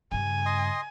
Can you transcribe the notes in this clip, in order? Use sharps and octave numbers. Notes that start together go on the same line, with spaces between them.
G2 C#3 G#5
D#5 C6 D#6